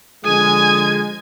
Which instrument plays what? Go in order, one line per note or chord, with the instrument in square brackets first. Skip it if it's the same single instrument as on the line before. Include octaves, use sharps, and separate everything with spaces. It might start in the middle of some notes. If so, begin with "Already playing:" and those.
[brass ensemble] D3 F3 G#3 [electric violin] G#5 G#6 [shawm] D#6